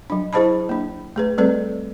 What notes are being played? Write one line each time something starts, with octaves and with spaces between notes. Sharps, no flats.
F#3 D4
E4 G#4 C5 D#5 A5 B5
A#3 D4
A3 G#4 B4
G3 A3 C4 A4 B4 D5